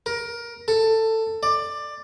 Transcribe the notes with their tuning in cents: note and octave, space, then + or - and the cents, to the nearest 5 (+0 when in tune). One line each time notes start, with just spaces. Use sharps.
A#4 +20
A4 +15
D5 +15